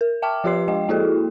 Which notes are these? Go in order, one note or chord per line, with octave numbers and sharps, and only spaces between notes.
A#4
E5 G5 A5 D6 F6
F3 F4 G4 B4 C6 C7
G#3 D#5 G5
A#3 E4 F#4 G#4 A4